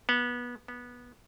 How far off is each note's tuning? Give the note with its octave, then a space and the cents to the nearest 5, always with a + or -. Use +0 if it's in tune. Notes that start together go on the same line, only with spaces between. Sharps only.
B3 -20
B3 -15